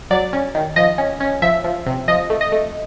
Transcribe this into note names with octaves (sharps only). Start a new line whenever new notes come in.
F#3 D5
C#4
D#3
F3 D#5
C#4
C#4
F3 E5
F3
C3
F3 D#5
A3
D#5
A3